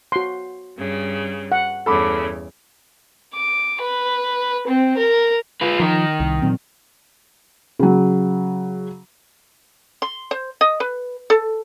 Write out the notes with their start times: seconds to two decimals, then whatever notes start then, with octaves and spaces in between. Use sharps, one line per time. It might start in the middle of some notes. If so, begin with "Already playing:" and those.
0.12 F#4 C6
0.77 G2 C#3
1.52 F#5
1.86 E2 G2 C#3 A4 B5 D6
3.35 D6
3.81 B4
4.67 C4
4.97 A#4
5.61 F4 B4
5.80 D#3 F3 A#4
6.20 C2
6.42 A#2 F#3 C4
7.79 C#3 F#3
10.02 C6
10.31 C5
10.61 D#5
10.80 B4
11.30 A4